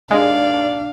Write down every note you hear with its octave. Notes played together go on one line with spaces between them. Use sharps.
D#2 G#3 D4 D5 F5